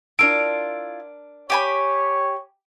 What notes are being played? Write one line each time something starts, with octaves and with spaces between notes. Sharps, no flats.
D4 E4 F4 A#4 A5 D7
G4 C#5 G#5 B5